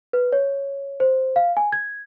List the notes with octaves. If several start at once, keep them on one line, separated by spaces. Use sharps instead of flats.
B4
C#5
C5
F5
G#5
G#6